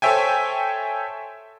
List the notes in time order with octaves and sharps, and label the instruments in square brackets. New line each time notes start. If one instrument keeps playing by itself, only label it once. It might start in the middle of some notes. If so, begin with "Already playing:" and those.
[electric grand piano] A4 C5 C#5 E5 G5 G#5